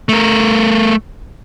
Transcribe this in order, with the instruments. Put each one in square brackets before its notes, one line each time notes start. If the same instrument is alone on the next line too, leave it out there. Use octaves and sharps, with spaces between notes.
[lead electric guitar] A3 A#4